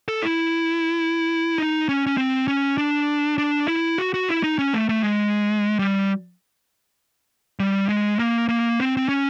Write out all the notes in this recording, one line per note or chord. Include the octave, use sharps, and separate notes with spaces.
A4
E4
D#4
C#4
C#4
C4
C#4
D4
D4
E4
F#4
F#4
E4
D#4
C#4
A3
A3
G#3
G3
G3
G#3
A#3
A#3
C4
C4
C#4